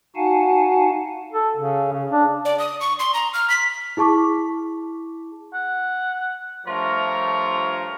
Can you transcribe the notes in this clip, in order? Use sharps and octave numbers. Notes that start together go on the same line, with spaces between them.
D#4 F#4 F5 F#5 G#5 A5
A4
C#3
C#3
D4
D5
D#6
C#6
C6
A#5
F6
B6
E4 G#4 A5 C#6 D6
F#5
G2 F3 A3 F4 A#4 C#5